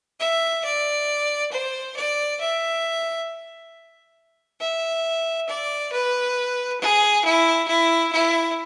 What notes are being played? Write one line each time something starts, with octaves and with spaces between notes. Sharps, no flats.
E5
D5
C5
D5
E5
E5
D5
B4
G#4
E4
E4
E4